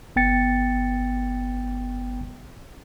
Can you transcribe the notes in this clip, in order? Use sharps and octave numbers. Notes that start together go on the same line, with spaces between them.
G1 B3 G5 A6 C#7